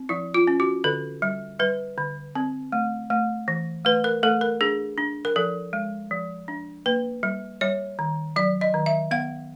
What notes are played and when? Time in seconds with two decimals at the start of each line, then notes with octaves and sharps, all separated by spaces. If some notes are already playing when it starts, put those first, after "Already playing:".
Already playing: C4
0.09 F3 E4
0.34 F4
0.47 C#4
0.60 F#4
0.84 D3 A4
1.22 G3
1.59 G3 B4
1.98 D3
2.35 C4
2.72 A3
3.10 A3
3.48 E3
3.85 A3 B4
4.04 A#4
4.23 A3 A4
4.41 A#4
4.61 D4 G#4
4.98 D4
5.25 A#4
5.36 F3 A4
5.73 G#3
6.11 F3
6.48 D4
6.86 A#3 B4
7.23 G3
7.61 G3 C#5
7.99 D#3
8.36 F#3 D5
8.61 D#5
8.74 D#3
8.86 E5
9.11 B3 F5